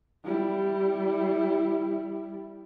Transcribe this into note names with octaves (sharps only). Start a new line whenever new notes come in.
G3 E4